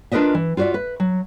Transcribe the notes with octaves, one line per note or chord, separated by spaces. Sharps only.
D4 F4 A#4 B4 D#5 E5
E3
F4 F#4 B4 D5 E5
B4
F#3